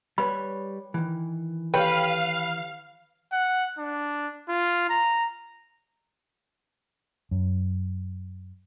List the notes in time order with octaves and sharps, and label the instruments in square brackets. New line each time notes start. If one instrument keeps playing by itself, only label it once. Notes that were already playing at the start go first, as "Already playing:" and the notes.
[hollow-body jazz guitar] G3 B4 C#5 [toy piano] B5
[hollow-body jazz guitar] D#3 E3
[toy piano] G4 C#5 G5 [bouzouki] B4 [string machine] F5
[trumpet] F#5
D4
F4
A#5
[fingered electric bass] F#2